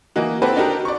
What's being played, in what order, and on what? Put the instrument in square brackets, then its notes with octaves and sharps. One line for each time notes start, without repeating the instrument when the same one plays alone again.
[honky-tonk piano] E3 A#3 D#4 F#4
C4 E4 F#4 G4 A4 B4
D4 D#4 F#4 G4 A4 A#4
D5 C#6